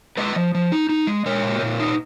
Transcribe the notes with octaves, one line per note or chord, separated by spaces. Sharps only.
G#3 B4 D#5
F3
F3
D#4
D#4
G#3
G#3 A#4 C#5
A#2
A#2
D#4